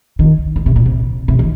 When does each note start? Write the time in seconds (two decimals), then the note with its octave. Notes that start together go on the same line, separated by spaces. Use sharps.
0.19 D#3
0.56 D#3
0.66 C3
0.76 A#2
0.86 C3
1.28 C3
1.39 D#3